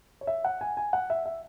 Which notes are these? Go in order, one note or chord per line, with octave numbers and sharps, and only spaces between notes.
C#5
E5
F#5
G#5
G#5
F#5
E5
E5